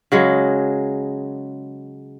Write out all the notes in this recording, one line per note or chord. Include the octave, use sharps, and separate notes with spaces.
C#3 F#3 G#3